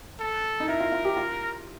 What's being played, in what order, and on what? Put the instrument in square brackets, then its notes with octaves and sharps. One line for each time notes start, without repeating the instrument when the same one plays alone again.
[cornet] A4
[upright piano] D#4
[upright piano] E4 [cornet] A#4
[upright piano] F4
F4
G4
F4